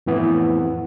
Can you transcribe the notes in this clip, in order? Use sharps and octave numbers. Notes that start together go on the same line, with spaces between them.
F2 A2 E3 B3